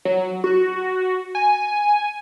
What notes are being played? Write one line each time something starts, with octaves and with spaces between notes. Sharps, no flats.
F#3
F#4
G#5